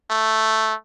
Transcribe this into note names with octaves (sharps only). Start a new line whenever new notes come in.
A3